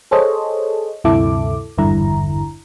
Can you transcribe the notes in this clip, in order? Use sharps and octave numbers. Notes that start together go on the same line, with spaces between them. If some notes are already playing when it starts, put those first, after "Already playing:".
G#4 A4 C5 C#5 D#5
D2 G2 C3 E4 A4 D6
G#1 E2 G2 D3 E4 A#5